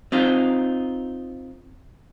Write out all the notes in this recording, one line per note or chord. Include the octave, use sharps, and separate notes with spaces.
C4 D#4 F4